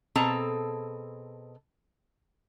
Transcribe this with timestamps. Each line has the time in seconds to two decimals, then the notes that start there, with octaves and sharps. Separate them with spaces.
0.15 B2 C4 G#4 A4 A5 A#5